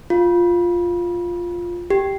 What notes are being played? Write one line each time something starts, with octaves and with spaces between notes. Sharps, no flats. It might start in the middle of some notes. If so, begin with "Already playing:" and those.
F4
G4